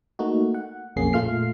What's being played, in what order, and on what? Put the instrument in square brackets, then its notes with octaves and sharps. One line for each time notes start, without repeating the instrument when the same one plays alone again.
[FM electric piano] A3 A#3 D#4 F#4
F#5
B1 F2 A#3 C#4 G#4 C7
A#2 A3 F4 F5 F6 C7